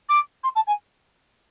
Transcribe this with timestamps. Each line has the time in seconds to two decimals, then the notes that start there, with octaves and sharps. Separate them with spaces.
0.09 D6
0.43 C6
0.55 A5
0.67 G#5